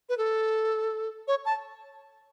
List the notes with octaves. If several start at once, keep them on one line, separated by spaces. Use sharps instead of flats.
B4
A4
C#5
A5